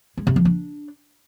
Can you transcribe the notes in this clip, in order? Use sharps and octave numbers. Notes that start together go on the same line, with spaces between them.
G#3
C3
F3
D4